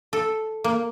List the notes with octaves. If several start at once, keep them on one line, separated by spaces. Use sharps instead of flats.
A4
A#3